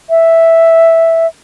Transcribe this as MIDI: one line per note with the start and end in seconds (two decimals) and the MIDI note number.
0.10 1.27 76